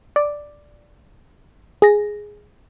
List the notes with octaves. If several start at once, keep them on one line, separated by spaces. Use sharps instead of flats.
D5
G#4 A#6